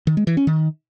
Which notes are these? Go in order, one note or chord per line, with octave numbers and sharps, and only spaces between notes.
D#3
G#3
E3
C#4
D#3